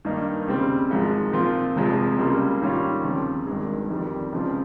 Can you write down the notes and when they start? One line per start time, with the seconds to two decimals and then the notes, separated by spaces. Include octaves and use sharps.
0.05 G2 D#3 A#3 D#4
0.47 D#2 C#3 G3 C4
0.90 G#1 G#2 F3 G#3
1.32 A#2 F3 C4 F4
1.76 F1 F2 C3 F3 G#3
2.18 C#2 C#3 G3 A#3 F4
2.61 G#2 D#3 G3 C#4 F4
3.03 D#2 C#3 F3 C4
3.47 G#1 G2 D#3 G#3
3.89 G1 F2 D#3 G3
4.32 C#2 C#3 F3 C4 F4